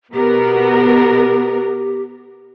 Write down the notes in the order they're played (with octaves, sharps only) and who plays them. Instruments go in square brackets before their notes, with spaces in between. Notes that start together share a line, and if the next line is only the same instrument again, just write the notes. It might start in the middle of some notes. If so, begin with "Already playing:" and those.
[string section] B2 B3 A#4 [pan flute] G4